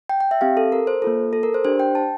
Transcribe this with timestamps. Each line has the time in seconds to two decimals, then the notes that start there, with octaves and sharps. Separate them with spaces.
0.09 G5
0.20 G5
0.31 E5
0.41 C4 G4 F5
0.57 A4
0.72 A#4
0.87 C5
1.02 A#3 F4 A4
1.33 A4
1.43 A#4
1.54 C5
1.65 D4 G4 C5
1.80 G5
1.95 A5